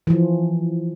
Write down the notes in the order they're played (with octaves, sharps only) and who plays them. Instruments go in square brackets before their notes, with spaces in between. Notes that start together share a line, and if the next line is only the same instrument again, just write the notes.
[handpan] E3 F3